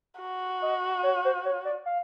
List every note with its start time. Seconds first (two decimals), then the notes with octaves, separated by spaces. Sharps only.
0.21 F#4
0.62 D#5
1.03 C#5
1.25 C5
1.45 C#5
1.65 D5
1.86 F5